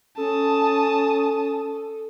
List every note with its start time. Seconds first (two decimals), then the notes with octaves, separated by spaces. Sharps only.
0.17 C#4 A4 A5 D#6